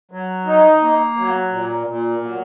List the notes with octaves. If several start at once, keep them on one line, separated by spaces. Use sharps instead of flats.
F#3
D#4
A#3
F#3
A#2
A#2
F#3